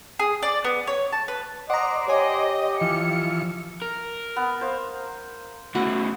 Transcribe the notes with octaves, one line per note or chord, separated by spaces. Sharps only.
G#4
D5
B3
C#5
A5
B4
C5 D5 D#5 F#5 A#5
G4 C#5 D#5 G#5
E3 F3 C#7
A#4
B3
C5 F5
A2 C#3 E4 F#4